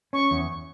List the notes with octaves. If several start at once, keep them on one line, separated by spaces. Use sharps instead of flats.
C#4 C#6
E2